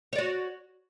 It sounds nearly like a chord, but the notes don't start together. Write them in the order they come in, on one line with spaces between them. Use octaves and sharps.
C#5 D5 F#4